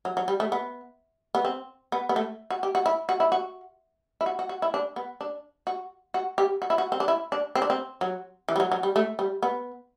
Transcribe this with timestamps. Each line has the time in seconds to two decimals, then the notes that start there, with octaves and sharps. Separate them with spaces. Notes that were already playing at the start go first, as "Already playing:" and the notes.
0.05 F#3
0.17 F#3
0.28 G3
0.40 A3
0.52 B3
1.35 B3
1.45 C4
1.92 B3
2.09 B3
2.16 A3
2.50 F#4
2.63 G4
2.75 F#4
2.86 E4
3.09 F#4
3.20 E4
3.32 F#4
4.21 E4
4.26 F#4
4.39 F#4
4.49 F#4
4.62 E4
4.74 D4
4.96 B3
5.21 D4
5.67 F#4
6.14 F#4
6.38 G4
6.62 F#4
6.70 E4
6.78 F#4
6.92 C4
7.00 D4
7.08 E4
7.32 D4
7.55 C4
7.62 D4
7.70 C4
8.01 F#3
8.49 E3
8.56 G3
8.60 F#3
8.72 F#3
8.83 G3
8.96 A3
9.19 G3
9.43 B3